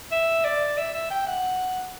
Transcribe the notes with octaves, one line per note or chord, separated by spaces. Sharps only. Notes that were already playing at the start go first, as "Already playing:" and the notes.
E5
D5
E5
E5
G5
F#5